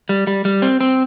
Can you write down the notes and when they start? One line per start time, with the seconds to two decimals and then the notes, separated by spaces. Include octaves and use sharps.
0.09 G3
0.27 G3
0.45 G3
0.62 C4
0.81 C4